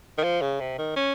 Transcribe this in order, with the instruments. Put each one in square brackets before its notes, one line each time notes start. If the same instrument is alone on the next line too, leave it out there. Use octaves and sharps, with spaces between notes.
[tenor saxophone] D#3
F3
C#3
C3
D#3
C#4